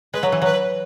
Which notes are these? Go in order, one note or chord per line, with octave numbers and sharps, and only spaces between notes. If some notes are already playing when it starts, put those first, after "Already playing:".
G#3 B4
F#3
E3
F#3 B4